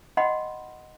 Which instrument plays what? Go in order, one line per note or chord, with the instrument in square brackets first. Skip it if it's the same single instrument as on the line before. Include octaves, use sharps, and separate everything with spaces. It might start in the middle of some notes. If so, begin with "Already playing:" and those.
[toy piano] D#5 F#5 G5 B5 C6